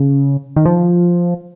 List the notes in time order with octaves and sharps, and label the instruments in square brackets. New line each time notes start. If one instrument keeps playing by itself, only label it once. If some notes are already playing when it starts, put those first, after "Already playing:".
Already playing: [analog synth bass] C#3
D#3
F3